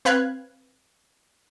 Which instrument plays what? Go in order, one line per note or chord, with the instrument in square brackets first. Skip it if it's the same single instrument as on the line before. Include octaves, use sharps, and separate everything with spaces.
[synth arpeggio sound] C4 B4 F5 F#6 G#6